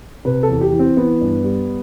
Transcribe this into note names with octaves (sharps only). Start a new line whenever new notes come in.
C3 B4
A4
E2
G4
E3
C4
E3 B3
G2
G3